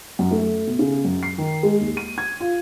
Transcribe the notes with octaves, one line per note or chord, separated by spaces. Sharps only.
F#2
A3
B2
C#3
F#2
C7
D#3
G#3
D#2
D#7
G#6
F4